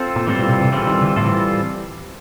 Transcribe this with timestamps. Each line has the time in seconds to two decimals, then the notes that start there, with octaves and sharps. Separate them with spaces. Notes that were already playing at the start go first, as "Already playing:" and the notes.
Already playing: C4 F4 A4
0.16 A#2
0.27 A2 E3 G3 C4 F4 A4
0.39 A#2
0.49 B2
0.61 C3
0.72 C#3 E3 G3 C4 F4 A4
0.87 D#3
1.01 D3
1.16 A2 E3 G3 C4 F4 A4